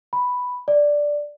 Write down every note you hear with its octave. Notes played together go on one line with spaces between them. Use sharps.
B5
D5